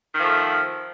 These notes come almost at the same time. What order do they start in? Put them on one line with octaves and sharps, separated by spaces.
D#3 F3 A3